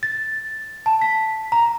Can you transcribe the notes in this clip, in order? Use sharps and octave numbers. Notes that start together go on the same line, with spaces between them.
A6
A5
B6
A#5